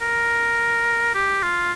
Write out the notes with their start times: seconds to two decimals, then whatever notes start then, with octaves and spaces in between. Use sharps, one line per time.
0.01 A#4
1.14 G4
1.43 F4